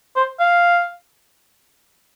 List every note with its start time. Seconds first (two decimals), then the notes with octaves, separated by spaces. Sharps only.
0.16 C5
0.39 F5